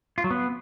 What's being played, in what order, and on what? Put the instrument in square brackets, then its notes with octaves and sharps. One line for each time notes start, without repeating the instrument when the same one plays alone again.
[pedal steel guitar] F4
F#3
B3